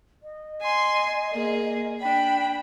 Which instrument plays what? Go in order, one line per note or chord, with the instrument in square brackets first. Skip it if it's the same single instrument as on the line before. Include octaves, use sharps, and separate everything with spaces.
[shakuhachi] D#5
[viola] G#5 C6
A#3 G#4
[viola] D4 B5 [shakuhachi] G5